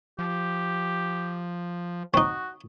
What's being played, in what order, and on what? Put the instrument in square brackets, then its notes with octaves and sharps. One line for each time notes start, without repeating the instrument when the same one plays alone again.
[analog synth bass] F3 [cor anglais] G4
[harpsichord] C4 D#4 [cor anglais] F#4 [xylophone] C#6 D#6